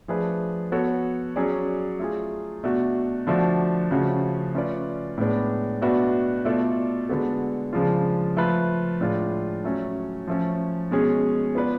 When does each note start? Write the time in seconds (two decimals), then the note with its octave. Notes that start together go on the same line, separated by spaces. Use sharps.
0.08 F3 A3 D4 G#4 B4
0.72 B3 F#4 A4 C#5
1.36 F#3 C#4 G#4 D5
1.99 A3 F4 G#4
2.63 B2 A3 D4 F#4
3.27 D3 F3 A3 D4 F#4
3.91 C#3 F3 A3 C#4 F#4
4.54 A3 C#4 F4 B4 D5
5.18 A2 G#3 B3 D4
5.82 B2 A3 D4 F#4 B4
6.45 B2 A3 F4 A4 D5
7.09 D3 G#3 B3 F#4 A4
7.73 C#3 F3 G#3 D4 F4
8.36 F3 A3 F4 B4
9.01 A2 G#3 D4 F4
9.64 F#3 A3 C#4
10.27 F3 A3 C#4
10.91 B2 G#3 C#4 G#4
11.55 B3 F4 B4 D5